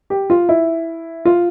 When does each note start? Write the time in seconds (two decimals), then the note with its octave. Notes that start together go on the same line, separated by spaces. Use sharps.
0.10 G4
0.30 F4
0.49 E4
1.25 F4